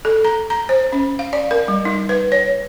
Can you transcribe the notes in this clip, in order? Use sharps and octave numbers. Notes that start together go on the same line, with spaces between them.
A4
A#5
A#5
C5
C#4
F5
D5
A#4
G3
D#4
B4
C#5